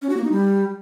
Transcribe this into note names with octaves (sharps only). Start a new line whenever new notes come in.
C#4
F#4
A#3
D#4
G3